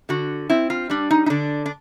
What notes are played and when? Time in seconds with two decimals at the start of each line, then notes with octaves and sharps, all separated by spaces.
0.09 D3 F#4
0.50 C4 E4
0.70 F4
0.90 G3 D4
1.11 D#4
1.26 D#4
1.30 D3 D4
1.66 D4